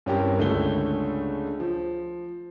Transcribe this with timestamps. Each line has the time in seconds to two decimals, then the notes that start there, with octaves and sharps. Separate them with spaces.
0.06 G2 C4 C#4 E4 G4 A#4
0.39 C#2 D3 A3 C#4 G7
1.60 F3